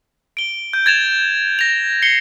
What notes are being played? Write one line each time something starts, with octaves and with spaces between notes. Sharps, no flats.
D7 G7
G6
G#6 A6 E7 F7
A#6 F7
C7 C#7 G7